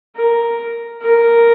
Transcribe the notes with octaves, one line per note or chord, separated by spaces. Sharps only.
A#4
A#4